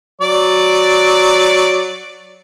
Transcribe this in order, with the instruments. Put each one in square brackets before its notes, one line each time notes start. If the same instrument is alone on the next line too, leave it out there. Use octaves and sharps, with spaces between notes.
[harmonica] F#3 D5